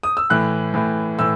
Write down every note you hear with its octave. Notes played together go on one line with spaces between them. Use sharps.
D#6
E6
A2 E3 F#6
A2 E3
A2 E3 E6